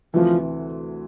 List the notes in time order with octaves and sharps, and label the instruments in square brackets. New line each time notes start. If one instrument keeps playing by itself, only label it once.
[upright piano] D2 C3 E3 [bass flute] F3